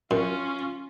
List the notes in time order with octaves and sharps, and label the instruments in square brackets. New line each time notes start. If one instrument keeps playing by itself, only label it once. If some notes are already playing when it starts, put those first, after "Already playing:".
[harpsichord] F#2 [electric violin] C#4 F4